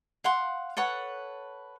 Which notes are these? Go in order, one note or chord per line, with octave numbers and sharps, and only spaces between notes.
F5 F#5 C6
A4 B4 C#5 F#5